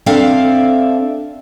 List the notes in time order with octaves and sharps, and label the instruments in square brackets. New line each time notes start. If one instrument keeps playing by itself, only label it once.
[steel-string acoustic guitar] C4 D4 A4 D5 E5 F5